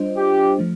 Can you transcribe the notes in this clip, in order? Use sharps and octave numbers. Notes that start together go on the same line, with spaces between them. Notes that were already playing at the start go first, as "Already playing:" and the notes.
Already playing: G3 D4 F4 C5 D#5
G4
F3 A3